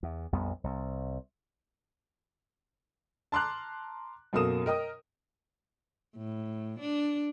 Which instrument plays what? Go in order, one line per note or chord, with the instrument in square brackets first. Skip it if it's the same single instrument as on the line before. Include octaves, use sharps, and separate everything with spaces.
[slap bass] E2
A#1 F2 G3 B3
C2
[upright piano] A5 A#5 C6 D6 F6 F#6
F#2 B2 A#3 A4 D#6 E7
A#4 D#5 G5 D#6
[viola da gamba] A2
D4